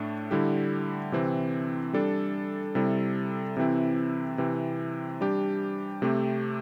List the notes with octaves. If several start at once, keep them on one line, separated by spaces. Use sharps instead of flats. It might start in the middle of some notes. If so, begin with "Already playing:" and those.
Already playing: A2 A3 D4
D3 G3 E4 G4
C3 E3 C4
G3 D4 A4
C3 G3 E4 A4
C3 E3 C4 E4
C3 E3 C4
G3 D4 G4
C3 A3 C4 G4